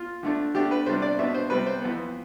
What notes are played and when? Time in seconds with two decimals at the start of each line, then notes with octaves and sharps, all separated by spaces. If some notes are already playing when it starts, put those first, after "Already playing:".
Already playing: F4
0.23 D3 A3 D4
0.54 D3 A3 D4 G4
0.71 B4
0.86 C3 G3 D4 C5
1.02 D5
1.19 B2 B3 D4 E5
1.34 C5
1.50 C3 G3 C4 B4
1.66 C5
1.82 F2 E3 B3